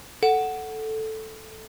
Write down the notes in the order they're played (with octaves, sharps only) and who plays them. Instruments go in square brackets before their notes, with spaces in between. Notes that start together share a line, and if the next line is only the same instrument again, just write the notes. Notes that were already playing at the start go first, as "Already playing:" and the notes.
[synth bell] A4 [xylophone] F#5